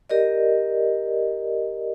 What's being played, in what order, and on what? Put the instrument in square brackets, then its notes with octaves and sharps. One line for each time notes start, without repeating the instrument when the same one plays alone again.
[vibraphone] G4 A#4 D5 D#5